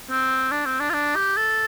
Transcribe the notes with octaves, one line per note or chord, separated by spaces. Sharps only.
C4
D4
C4
D4
F4
D4
G4
A4